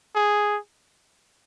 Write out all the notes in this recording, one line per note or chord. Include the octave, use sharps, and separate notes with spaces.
G#4